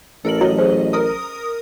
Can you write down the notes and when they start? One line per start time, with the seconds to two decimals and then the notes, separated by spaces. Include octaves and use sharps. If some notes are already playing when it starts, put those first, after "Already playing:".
0.25 A1 A4 A#4 F#7
0.41 F#3 D#5
0.58 G#4 C5
0.93 C#4 A#4 D#6